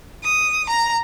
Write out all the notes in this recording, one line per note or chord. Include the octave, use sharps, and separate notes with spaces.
D#6
A#5